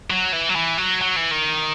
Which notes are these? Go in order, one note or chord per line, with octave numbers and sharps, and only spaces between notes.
F#3
E3
F#3
E3
F#3
F#3
E3
D#3